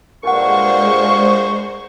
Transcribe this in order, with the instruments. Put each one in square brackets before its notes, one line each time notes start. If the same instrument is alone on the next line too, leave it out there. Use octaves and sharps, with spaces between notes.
[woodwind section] G2 A#2 C#6 [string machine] G#3 C5 [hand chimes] A#4 F#5